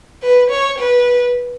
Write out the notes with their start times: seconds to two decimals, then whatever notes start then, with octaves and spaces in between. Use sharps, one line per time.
0.22 B4
0.50 C#5
0.78 B4